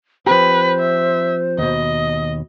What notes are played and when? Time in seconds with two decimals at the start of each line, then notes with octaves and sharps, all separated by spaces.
0.27 F3 C4 G4 B4 C5
0.79 E5
1.58 D#2 B2 D#5